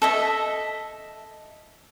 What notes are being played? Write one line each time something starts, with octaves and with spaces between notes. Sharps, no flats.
A4 D#5 E5